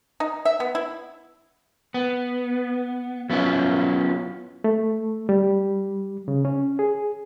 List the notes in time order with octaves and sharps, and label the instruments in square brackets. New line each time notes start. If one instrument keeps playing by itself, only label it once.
[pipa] D#4
E5
B3
E4
[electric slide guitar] B3
F#3 B3 C#4 E4 F4
[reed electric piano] A3
G3
C#3
C#4
G#4